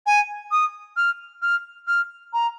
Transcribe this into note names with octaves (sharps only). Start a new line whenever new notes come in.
G#5
D#6
F6
F6
F6
A#5